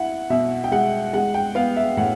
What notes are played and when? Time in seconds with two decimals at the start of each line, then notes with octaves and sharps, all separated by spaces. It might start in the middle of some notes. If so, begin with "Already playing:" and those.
Already playing: E4 F#5
0.30 B2 E5
0.64 G5
0.72 G#3 F#5
1.13 G#3 F#5
1.34 G5
1.55 B3 F5
1.77 E5
1.97 A2 F#5